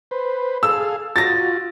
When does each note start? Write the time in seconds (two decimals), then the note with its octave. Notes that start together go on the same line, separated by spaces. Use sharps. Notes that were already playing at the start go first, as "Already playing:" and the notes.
0.11 B4 C5
0.63 G#4 A4 F5 E6
1.16 F4 F#4 A6 A#6